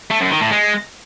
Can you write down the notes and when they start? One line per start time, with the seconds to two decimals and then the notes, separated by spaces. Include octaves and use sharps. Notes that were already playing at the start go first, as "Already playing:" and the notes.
0.10 A3
0.21 F#2
0.31 D#3
0.41 A2
0.51 G#3